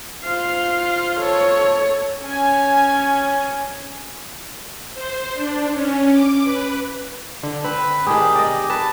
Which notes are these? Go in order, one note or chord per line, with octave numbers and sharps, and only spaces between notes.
F4 C5 F5
A4 C#5
C#4 G#5
C5
D4
C#4
D6
B4
D3
C4 B4
D#3 D4 G4 G#4
D5 D#5
B4 A5